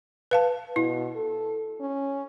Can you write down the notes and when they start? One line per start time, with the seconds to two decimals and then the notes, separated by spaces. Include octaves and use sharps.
0.31 B4 F5 A5
0.76 B2 E4
1.16 A4
1.80 C#4